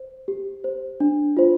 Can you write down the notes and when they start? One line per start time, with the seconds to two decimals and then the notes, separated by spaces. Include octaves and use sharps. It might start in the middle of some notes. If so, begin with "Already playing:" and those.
Already playing: C5
0.28 G4
0.64 C5
1.00 D4
1.37 F4 C5